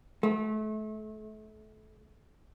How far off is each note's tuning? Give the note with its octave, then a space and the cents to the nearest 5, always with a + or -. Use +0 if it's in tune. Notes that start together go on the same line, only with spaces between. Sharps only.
A3 -30